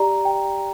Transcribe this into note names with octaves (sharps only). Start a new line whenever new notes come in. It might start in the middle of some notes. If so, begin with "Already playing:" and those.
Already playing: G4 D5 A#5
G5